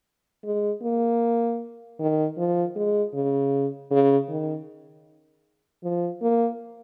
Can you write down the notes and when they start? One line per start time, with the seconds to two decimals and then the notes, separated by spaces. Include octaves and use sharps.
0.44 G#3
0.83 A#3
1.99 D#3
2.38 F3
2.76 G#3
3.14 C#3
3.91 C#3
4.29 D#3
5.84 F3
6.22 A#3